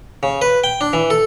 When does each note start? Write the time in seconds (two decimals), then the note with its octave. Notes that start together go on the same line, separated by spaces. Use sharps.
0.23 C#3
0.42 B4
0.64 G5
0.81 D4
0.93 E3
1.10 A4